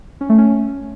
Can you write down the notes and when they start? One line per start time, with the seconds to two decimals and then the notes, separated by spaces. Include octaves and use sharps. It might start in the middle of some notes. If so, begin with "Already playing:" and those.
0.21 C#4
0.29 A3
0.38 C#4